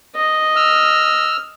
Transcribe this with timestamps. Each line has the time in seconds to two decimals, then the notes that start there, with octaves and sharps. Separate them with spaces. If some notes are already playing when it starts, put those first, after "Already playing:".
0.15 D#5
0.56 E6 F6